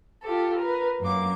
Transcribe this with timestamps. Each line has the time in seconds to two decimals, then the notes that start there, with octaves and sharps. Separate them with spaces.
0.21 F4 G4 A4
0.58 A#4 B4
1.00 F#2 A#3 D6